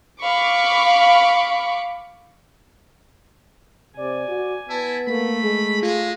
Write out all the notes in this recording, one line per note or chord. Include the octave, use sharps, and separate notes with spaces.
F5 B5 C#6 D6
C3 D5 G#5
F#4
B3 E4 A5
A3 A#3 B5
G#3 G#4
G#3 F4